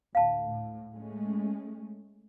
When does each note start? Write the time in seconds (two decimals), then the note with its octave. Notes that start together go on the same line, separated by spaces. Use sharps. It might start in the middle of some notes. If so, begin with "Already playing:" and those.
0.15 D2 A2 F5 A5
0.48 A2
0.93 G#3 A3 C#4